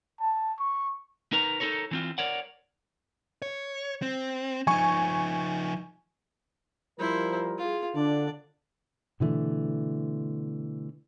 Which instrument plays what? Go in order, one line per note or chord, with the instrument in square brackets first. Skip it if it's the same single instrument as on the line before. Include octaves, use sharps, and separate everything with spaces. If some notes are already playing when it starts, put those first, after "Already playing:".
[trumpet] A5
C#6
[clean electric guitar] D#4 A#4 B4 A#5
D#4 F4 A4 A#4 C#5
E3 C4 F4
A#4 C#5 D5 F#5
[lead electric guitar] C#5
C4
[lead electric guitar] F3 D#4 [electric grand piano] G#5 C#6
[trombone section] F3 G3 A#4 [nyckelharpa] E4 C5
[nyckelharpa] F4 G#4
[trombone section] D3 D4 [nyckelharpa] D5
[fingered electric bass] B2 D3 E3 A3